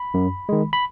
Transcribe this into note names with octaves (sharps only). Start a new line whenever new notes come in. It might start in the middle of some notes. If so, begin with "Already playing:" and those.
Already playing: B5
F#2
D#3 G#3
B5